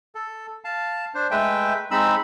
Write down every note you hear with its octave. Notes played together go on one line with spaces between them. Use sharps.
A4
F5 A5
D4 C5
G#3 A3 B4 E5 G5
G#3 C4 D#4 B5 E6